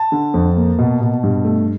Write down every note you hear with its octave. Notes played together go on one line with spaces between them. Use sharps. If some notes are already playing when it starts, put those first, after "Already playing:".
Already playing: A5
D3
F2
A#3
B2
B2
G2
A3